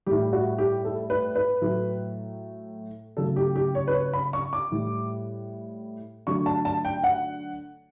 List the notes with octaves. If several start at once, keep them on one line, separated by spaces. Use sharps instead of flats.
A2 G3 G4
F#4
G4
A4
B4
B4
A2 F#3 A3
C#3 F#3 A3 A4
G4
G4
C#5
B4
C#5
B5
C#6
D6
A2 G3
D3 F#3 A3 C#6
A5
A5
G5
F#5